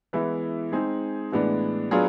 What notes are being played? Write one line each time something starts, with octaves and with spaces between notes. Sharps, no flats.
E3 G#3 B3 E4
G#3 C4 D#4 G#4
A2 E3 G#3 B3 D4
F#3 B3 D4 F4 G#4